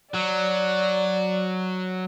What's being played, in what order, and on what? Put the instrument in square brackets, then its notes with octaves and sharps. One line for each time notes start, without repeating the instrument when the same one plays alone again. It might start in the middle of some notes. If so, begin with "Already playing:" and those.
[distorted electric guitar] F#3 [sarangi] D5